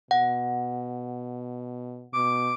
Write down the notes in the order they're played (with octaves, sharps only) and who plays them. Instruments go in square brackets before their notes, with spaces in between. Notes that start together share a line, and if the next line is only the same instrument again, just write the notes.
[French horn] B2 [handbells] F#5
[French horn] B2 [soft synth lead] D6